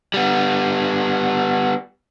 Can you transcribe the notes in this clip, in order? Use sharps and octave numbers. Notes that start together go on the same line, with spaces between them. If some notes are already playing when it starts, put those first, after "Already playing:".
G3 B3